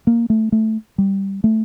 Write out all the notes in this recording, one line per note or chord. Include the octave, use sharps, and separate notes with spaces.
A#3
A3
A3
G3
A3